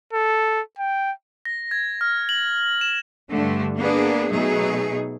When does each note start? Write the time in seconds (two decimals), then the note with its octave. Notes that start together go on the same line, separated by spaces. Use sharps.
0.13 A4
0.79 G5
1.45 A#6
1.71 G#6
2.01 F6
2.29 F#7
2.81 E7
3.30 G2 D3 A3
3.78 A#3 B3 D4 G#4
4.32 B2 F#3 A3 D#4 G#4